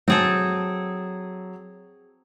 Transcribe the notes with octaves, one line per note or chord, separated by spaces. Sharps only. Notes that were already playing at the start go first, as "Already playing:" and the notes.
F#3 C4 G#4 A4